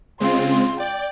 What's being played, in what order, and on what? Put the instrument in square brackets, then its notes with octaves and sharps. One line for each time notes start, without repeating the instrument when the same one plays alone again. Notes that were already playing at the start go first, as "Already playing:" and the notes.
[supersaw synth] C#3 G#3 C4 [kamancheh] F4 C6
[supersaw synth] D5 [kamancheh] G5